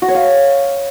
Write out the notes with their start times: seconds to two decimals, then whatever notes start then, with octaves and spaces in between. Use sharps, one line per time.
0.02 F#4
0.08 C#5
0.15 F5